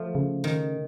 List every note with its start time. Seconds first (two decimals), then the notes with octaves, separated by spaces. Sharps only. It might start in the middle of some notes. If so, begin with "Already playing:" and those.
Already playing: F3 A3
0.15 C#3
0.44 D#3